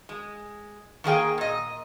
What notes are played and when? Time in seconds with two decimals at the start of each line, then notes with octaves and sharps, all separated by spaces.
0.09 G#3
1.04 D#3 A#3 G#4 G5
1.38 A#2 D#5